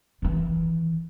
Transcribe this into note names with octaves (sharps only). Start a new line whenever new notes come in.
D#3 E3